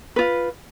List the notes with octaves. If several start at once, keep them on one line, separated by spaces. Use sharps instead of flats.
F4 B4